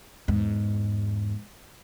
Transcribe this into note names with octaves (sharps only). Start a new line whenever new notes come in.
E2 G#2